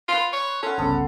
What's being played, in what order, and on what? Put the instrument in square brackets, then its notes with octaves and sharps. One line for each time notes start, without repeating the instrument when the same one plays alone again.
[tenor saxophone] F4 [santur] B4 C6
[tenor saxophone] C#5
[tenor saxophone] C#4 [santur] A4 F#5 [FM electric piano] G#5 C6 F6
[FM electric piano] G1 C2 C#3 [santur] B3 A4 C5